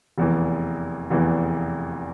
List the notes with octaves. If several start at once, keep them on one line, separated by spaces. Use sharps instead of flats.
F1 E2 E3
F1 E2 E3